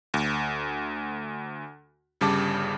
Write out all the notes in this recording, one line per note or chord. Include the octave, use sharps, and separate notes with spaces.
D2
G1 C#3 G3 A5 D6